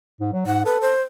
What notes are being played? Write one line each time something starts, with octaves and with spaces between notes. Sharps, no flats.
G#2
F#3
G#2 F#5
A4 B4
C5